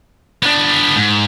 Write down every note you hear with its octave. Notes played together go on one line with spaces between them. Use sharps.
B3 D4
G#2